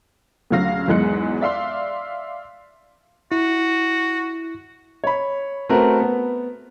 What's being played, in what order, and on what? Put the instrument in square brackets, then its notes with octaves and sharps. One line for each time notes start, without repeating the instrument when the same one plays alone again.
[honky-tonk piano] D2 C#3 F#3 F5 A#6
E2 G#2 F#3 G#3 F#6 C#7
D5 E5 F5 C6
[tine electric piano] E4 [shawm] F#4
[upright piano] C#5 B5
A3 C4 F#4 A#4 B4
B3